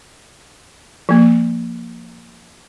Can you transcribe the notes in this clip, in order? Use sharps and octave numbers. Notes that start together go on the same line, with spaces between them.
F3 A#3